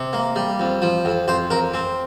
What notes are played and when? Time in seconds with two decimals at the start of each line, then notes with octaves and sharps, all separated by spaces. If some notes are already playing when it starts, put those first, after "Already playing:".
Already playing: C3
0.13 A#3
0.36 G3
0.59 F2
0.82 F3
1.05 F2
1.28 F2 C5
1.50 F2 A#4
1.74 C4